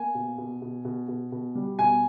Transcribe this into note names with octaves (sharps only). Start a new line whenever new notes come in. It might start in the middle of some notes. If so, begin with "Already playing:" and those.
Already playing: A#3 G#5
B2
B2
B2
B2
B2
B2
G3
B2 G#5